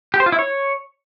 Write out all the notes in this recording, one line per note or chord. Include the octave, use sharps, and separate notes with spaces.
G4
C5
F4
E4
C#5